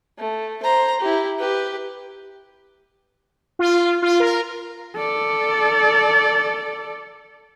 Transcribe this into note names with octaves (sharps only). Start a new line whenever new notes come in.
A3
C5 A#5
E4 G4
G4 B4
F4
F4
A#4
A4 D5